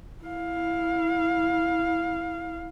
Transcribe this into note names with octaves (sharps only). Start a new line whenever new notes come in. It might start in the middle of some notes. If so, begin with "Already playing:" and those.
E4 F5